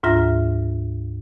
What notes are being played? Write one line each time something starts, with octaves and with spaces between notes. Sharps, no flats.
D2 G#2 F4 E5 A#5 A#6